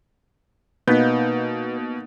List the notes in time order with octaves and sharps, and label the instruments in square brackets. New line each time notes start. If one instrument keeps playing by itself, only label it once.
[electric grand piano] B2 G6 [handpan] A#3 D#4 [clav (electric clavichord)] B3